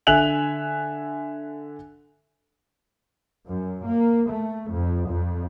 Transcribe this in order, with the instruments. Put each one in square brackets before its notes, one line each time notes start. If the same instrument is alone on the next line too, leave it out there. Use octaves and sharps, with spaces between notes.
[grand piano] D3 E5 G#5 F#6 F7 F#7
[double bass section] F#2
A#3
A3
F2
F2